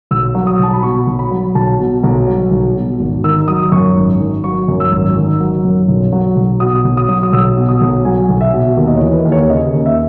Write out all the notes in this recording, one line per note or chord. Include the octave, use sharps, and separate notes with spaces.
B1 E6
F#3
D#6
B1 A5
B5
B2 C#6
B1
B5
F#3
B1 A5
B2
B1
F#3
B1
B2
G#1
D#3 E6
F#3 D#6
F#2 C#6
G#1
D#3
F#3 C#6
F#2
E6
G#1
D#3
F#3
F#2
B1
F#3
B1
B2 D#6
B1
D#6
F#3
D#6
B1 E6
B2
D#6
B1
F#3 G#5
B1
E5
B2
D#2
D#5
C#5
E3
B4
D#2
C#5
C#3 D#5
D#2
E5